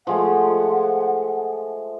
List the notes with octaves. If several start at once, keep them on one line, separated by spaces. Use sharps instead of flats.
F3 G#3 A3 F#5